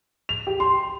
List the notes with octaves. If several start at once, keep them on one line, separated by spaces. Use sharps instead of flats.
F7
G4
C6